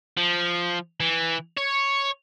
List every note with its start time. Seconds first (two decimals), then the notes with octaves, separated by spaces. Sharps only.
0.17 F3
1.00 E3
1.57 C#5